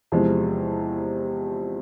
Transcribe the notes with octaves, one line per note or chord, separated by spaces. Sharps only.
E2 C3 F3 G#3 C4